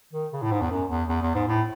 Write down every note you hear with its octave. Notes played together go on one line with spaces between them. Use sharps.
D#3
C#3
A2
G#2
E2
F#2
E2
E2
E2
G#2
A2